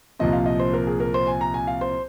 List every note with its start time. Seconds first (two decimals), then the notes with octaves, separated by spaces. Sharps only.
0.19 C2 A#2 F3 C4 D#5
0.33 F5
0.46 D#5
0.59 C5
0.73 A#4
0.87 G#4
1.00 A#4
1.14 C5
1.27 G#5
1.41 A#5
1.54 G#5
1.67 F5
1.81 C5